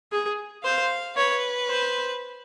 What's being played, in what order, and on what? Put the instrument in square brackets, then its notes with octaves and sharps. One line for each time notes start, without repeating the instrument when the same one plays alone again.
[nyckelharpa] G#4
[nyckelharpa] C5 [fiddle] F5
[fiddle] B4 [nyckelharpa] C#5
[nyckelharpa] C5